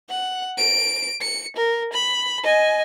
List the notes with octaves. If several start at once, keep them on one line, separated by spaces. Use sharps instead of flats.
F#5
D7
C#7
A#4
B5
D#5 G#5